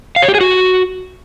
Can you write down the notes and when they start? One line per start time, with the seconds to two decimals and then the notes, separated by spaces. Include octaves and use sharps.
0.16 F5
0.22 C#5
0.28 G4
0.35 G#4
0.41 F#4